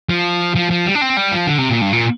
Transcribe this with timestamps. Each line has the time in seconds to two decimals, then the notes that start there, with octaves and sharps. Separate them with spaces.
0.10 F3
0.55 F3
0.71 F3
0.86 G3
0.95 D4
1.01 C4
1.17 G3
1.31 F3
1.47 D3
1.58 C3
1.70 A#2
1.81 G2
1.93 A#2